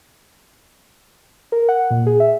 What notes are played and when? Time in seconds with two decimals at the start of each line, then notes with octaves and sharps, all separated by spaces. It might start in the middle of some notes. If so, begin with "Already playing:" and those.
1.52 A#4
1.69 F#5
1.91 A#2
2.06 G#4
2.20 E5